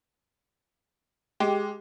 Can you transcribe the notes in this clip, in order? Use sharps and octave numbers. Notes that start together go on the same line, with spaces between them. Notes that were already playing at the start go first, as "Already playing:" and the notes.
G#3 G4